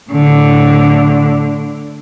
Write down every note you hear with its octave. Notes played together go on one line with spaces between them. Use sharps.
A2 D3